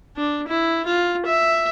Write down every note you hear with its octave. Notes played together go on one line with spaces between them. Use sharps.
D4
E4
F4
E5